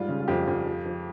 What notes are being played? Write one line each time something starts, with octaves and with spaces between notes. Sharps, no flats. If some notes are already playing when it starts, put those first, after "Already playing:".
Already playing: G#2 G3 F4
C#3
F4
F2 G4
F2
F3
F3